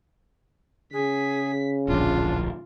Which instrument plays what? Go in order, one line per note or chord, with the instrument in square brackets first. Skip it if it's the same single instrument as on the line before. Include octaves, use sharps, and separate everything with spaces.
[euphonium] C#3 [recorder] G#4 [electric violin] B6
[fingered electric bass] D1 A#1 [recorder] D4 [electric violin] F4